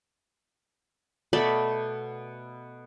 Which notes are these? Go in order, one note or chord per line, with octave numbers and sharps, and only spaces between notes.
B2 A3 D5 B5